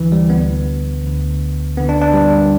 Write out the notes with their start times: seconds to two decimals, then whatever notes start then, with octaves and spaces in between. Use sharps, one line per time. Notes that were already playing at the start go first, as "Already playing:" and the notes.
Already playing: D2 D3 E3
0.12 G3
0.30 D2 D3 B3
1.04 D2 D3
1.77 D2 D3 B3
1.89 D4
2.01 D4
2.13 G3